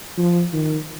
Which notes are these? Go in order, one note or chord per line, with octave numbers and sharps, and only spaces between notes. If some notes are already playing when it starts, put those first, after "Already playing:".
F3
D#3